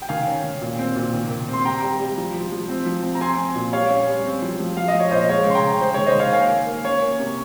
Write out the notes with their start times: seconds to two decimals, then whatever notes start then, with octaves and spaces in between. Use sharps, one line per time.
0.02 G5
0.09 D#3 F5 G#5
0.27 C#4
0.44 D#3
0.61 A#2
0.79 C4
0.96 A#2
1.13 D#3
1.30 D#3
1.48 C4
1.53 C6
1.65 C3 G5 A#5
1.82 G3
2.00 G3
2.18 F3
2.34 F3
2.52 F3
2.69 C4
2.86 F3
3.03 C4
3.15 A#5
3.21 C4 G#5 C6
3.38 C4
3.55 A#2
3.73 G3 C#5 F5
3.90 C#4
4.07 G3
4.25 C4
4.42 F3
4.60 F3
4.77 F3 F5
4.88 D#5
4.94 F3
5.00 C#5
5.11 A#2 C5 D#5
5.29 G#3 C#5 F5
5.46 C#3 C6
5.55 G5 A#5
5.63 C#3
5.81 G#3 C5
5.94 C#5
5.98 D#3
6.06 C5 D#5
6.15 D#3 C#5 F5
6.33 A#3 F5 G#5
6.50 A#3
6.67 A#3
6.85 C#4 C#5
7.02 A#3
7.20 C3